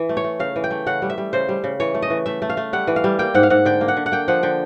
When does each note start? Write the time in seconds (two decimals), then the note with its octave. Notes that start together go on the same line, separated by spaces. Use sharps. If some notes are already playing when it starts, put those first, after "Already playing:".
Already playing: E3
0.09 A3
0.17 C#5
0.24 A3
0.39 C#3 F5
0.56 E3
0.64 G5
0.71 A3
0.86 C#3 F#5
1.02 G3
1.10 E5
1.18 G3
1.33 C#3 C5
1.49 G3
1.64 C#3
1.80 E3 C#5
1.94 A3
2.02 D#5
2.10 E3
2.26 A3 E5
2.42 A3
2.50 F5
2.57 A3
2.73 G3 F#5
2.87 E3
2.96 F5
3.04 G3
3.19 A#3 G5
3.34 G#2 F#5
3.43 F5
3.50 G#2 F#5
3.65 D3 G5
3.81 A#3
3.88 F#5
3.97 D3
4.06 F#5
4.12 A#3 G5
4.28 F3 F#5
4.43 D3 G5